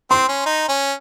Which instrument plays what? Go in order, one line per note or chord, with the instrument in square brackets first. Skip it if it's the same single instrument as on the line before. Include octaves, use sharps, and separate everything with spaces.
[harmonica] C4 [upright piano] C6
[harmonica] C#4
D#4
C#4